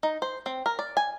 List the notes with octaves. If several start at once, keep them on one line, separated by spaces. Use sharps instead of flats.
D#4
C5
C4
A#4
D5
G#5